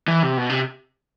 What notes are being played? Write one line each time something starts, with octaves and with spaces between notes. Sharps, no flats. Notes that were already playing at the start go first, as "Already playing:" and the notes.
E3
C3
B2
C3